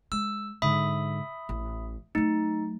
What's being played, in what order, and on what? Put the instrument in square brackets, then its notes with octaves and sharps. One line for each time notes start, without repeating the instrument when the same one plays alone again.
[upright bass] G#3 [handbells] E6
[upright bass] G#2 D3 [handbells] E5 B5 D#6
[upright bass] A1
[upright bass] F#3 A3 [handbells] D#4